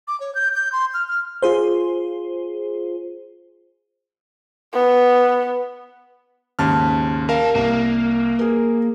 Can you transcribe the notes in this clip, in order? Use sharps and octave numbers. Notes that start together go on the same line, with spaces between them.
D6
C#5
G6
G6
C6
F6
F6
F4 G#4 C5
B3
D#2 G#2 C#3 A5 F6
G4 A#4 F5 A5
C2 A#3
G#4 A#4